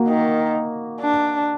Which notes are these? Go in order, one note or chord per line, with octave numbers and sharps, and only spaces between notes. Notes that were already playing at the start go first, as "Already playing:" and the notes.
Already playing: A#3 F#4
D#3
D4